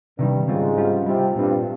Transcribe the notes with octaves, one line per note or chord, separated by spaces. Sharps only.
G2 C3 D#3 G3
G#2 C#3 G3 C4 F4
G3 C#4 F4
C3 G3 C4 F4
G2 A#2 G3 C4 F4